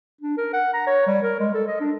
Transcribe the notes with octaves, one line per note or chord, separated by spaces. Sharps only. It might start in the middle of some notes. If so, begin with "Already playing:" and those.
D4
A#4
F#5
A#5
C#5
G3
A#4
G#3
A4
D#5
D4